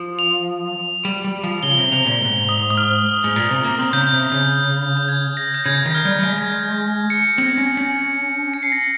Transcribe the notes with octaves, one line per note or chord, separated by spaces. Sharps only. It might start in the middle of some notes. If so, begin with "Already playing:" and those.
Already playing: F3
F7
G3
G3
F3
C#3 G7
C3
C3 F7
A#2
G#2
D#6
D#6
F6
G#2
A#2
C3
A#3
C4
C#3 G6
C3
C#3
G6
G#6
A#6
G6
C#3 G#6
D#3
F6
G3
G3
G#3
C#7
C4
C#4
C#4
C#7
C7
A#6
C7